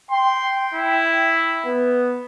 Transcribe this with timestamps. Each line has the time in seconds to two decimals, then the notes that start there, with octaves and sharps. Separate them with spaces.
0.11 G5 C6
0.74 E4
1.66 B3